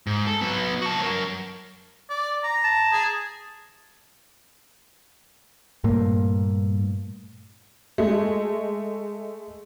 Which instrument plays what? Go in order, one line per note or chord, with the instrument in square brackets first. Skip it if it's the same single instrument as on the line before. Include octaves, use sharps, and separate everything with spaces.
[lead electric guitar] G#2
A4
F#3 B3
F#4 A5
F#3 A#4
[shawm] D5
A#5
[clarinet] A5
[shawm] G#4
[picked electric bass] G2 A#2 A3 A#3
[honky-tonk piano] G#3 A3